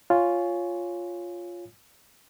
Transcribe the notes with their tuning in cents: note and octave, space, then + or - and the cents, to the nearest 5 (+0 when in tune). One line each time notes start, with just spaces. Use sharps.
F4 +0 C#5 +0 G#5 +0